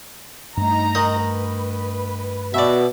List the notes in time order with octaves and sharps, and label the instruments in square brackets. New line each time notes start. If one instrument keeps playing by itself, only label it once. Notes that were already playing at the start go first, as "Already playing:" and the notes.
[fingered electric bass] G2 A3 [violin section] D#4 A#5
[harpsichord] D#3 D#5 D#6
[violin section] B4
[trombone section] B2 [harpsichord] D5 E5